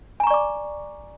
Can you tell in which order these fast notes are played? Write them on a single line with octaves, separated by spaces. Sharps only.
G#5 A#5 C#6 D5 D6